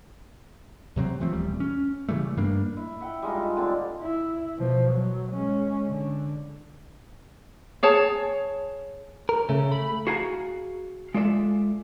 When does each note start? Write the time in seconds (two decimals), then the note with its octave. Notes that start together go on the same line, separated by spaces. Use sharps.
0.96 E2 C3 F#3 C4
1.20 E3 F3 A3 C4
1.33 D#1 E2 G3
1.60 C#4
2.09 C#3 E3 G3 A3
2.37 G2 G3 A#3 D4
2.77 E4
3.00 E5 F#5 G5
3.23 G3 G#3 D#4 F4
3.57 D3 C4 D4
4.01 E4
4.58 B2 F3
4.91 F#3
5.32 G#3 C#4
5.87 D3
7.83 G#4 C#5 A5
9.29 A#4
9.49 C#3 A3
9.72 B5
10.07 F#4 G#4 F5 G#5 A#5
11.14 G#3 F4 A4 D5 E5